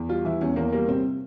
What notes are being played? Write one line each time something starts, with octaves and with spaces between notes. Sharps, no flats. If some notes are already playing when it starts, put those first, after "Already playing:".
Already playing: E2
G3 F4
E3 E4
E2 C#4
E2 A#3
G3 A#3
C3 C4